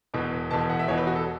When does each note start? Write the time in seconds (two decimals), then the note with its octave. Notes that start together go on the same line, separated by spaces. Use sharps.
0.14 E1 E2 B2
0.51 E1 E2 B2 A5
0.70 F#5
0.79 E5
0.88 E1 E2 B2 C#5
0.98 B4
1.07 F#4
1.16 A4